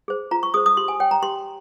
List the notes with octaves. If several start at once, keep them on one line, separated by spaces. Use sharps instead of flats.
G#4 C5
F4 A#5
C#6
G#4 C5 D#6
D#6
G4 C6
G#5
C#5 G5
A#5
G4 C6